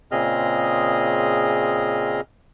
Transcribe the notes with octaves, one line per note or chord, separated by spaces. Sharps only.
A#2 C#3 C4 G#4 D#5 F6